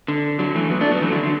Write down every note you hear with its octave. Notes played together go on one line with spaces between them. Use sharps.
D3
D3 F#3
E3 A3
F#3 B3
A3 D4
F#3 B3
E3 A3
D3 F#3
D3